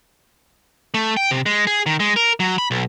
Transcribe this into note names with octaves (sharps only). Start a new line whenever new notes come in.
A3
G5
C3
G#3
G#4
D#3
G#3
A#4
F#3
B5
B1